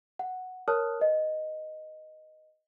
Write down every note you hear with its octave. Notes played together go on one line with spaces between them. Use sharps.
F#5
A#4 C#5 A5 D#6 F6 F#6
B4 D#5